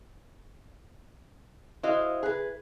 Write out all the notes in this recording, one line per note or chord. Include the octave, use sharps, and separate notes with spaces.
E4 F#4 C5 D#5 F5
G#4 B4